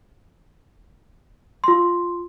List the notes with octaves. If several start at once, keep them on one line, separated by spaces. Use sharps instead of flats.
F4 C6